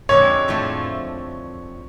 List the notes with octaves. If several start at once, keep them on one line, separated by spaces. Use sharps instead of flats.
F2 D3 G#3 C#5
A2 F3 A3